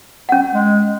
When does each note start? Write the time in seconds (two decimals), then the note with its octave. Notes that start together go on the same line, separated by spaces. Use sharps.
0.29 C#4 F#5
0.54 G#3